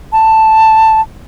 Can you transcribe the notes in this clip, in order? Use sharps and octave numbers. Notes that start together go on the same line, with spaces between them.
A5